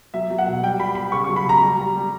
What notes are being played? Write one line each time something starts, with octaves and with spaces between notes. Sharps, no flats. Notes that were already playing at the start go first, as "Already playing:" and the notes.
F#3 E5
F#3
F#5
B2
G3 G5
G3 B5
G3 B5
C#3 C#6
F#3 C#6
B5
C#3 A#5
G3
G3
G3